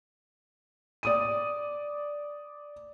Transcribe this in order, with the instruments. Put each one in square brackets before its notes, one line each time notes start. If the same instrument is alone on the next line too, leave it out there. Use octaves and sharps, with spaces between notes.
[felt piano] D5 D#6 D#7